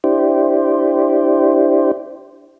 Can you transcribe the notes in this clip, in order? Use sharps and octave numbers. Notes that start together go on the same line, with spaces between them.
D4 E4 G4 C5